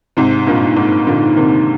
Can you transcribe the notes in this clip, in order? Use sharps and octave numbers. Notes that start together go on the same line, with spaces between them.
G#2 C3
G2 A#2
G#2
A#2 D3
C3 D#3